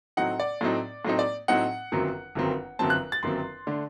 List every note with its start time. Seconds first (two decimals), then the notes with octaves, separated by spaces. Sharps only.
0.17 A2 F#3 C4 D#4 F#5
0.40 D5
0.61 A2 F#3 C4 D#4
1.05 A2 F#3 C4 D#4
1.19 D5
1.48 A2 F#3 C4 D#4 F#5
1.92 G1 F#2 D#3 F#3 C4
2.35 G1 F#2 D#3 F#3 C4
2.79 G1 F#2 D#3 F#3 C4 A5
2.90 F#6
3.12 A6
3.23 G1 F#2 D#3 F#3 C4 C6
3.67 D3 A3 D4